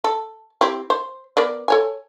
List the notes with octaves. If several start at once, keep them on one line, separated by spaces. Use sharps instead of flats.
A4
C4 E4 G4
C5
B3 A#4 D5
A4 C#5 G#5